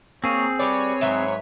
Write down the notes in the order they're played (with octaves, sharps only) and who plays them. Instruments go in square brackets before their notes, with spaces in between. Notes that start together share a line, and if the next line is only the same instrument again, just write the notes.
[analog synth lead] A#3 [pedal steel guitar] C4 G#4 [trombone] C#5
[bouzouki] G3 D5 [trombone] B4 [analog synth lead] C#5
[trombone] G#2 [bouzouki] F#3 B4 E5